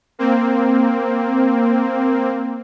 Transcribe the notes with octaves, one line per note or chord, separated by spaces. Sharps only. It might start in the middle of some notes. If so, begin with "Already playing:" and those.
A#3 C4